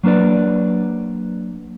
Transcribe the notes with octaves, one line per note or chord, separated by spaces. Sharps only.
F#3 A#3 D4 B4 D5